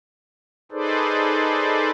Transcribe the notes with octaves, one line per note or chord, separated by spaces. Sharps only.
D#4 G#4 A4 B4 C5 D5